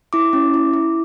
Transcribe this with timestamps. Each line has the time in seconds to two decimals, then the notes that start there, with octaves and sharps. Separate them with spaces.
0.13 E4 D6
0.33 C#4
0.54 E4
0.73 E4